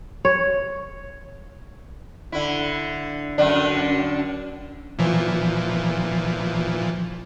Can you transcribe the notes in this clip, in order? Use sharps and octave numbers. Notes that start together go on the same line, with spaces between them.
C#5
D3 E4
F#2 D3 D4
A#2 E3 F3